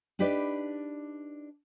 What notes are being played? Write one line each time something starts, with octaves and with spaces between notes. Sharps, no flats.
D4 D#4 G4 B4 D5